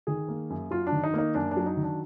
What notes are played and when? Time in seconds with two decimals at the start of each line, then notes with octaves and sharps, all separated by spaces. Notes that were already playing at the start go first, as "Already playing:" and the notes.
0.07 D#3 G#4
0.28 A#3
0.50 F#2
0.71 F#3 F4
0.87 D4
0.92 D#3
1.04 D#4
1.14 A#3 D#4
1.35 F#2 D4
1.51 D4
1.57 F#3
1.66 D#4
1.77 D#3
1.83 D4